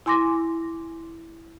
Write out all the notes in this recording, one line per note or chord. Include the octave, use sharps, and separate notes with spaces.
E4 G#5 C6 D6 A#6